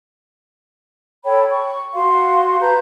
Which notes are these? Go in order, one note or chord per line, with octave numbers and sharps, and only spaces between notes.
A4 C#5 G5 B5
C#6
F#4 F5 C6
B4 A5 A#5 G6